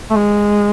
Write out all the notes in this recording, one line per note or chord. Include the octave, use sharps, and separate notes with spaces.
A3
G#3